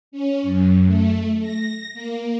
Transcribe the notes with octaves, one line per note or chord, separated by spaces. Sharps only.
C#4
F#2
A3
A#6
A#3